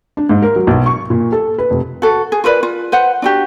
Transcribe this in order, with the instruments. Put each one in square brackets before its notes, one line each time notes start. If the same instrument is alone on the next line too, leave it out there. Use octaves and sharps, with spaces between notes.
[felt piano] D4
G#2
A#4
F#3
B1
C#6
A#2
A4
B4
F1
[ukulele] F#4 A4
G#4
F4 A#4 B4 D5
F4
B4 C5 F#5
D4 F#4 G4